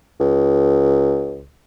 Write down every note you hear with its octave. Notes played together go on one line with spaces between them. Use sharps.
C#2